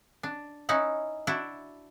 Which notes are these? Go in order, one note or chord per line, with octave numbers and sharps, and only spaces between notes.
D4
C#4 D#4 E4 F#5
D4 E4 F#4